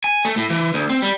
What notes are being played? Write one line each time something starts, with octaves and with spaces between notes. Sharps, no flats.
G#5
A3
A2
E3
D2
C4
G3